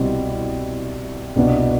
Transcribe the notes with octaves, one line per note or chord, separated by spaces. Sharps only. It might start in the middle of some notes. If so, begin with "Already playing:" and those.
Already playing: C2 B2 G3 C4 E4
C2 B2 B3 D4